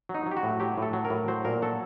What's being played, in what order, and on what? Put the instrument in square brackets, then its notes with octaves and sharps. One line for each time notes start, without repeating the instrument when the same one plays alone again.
[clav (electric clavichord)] F#3
D#4
F#3
G4
F#4
A2
F#3 G4
A2 A4
F#3
A#4
A2
F#3 C5
A#2 A#4
F#3 A4